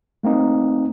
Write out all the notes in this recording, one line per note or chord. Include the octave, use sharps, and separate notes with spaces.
A3 A#3 C4 D#4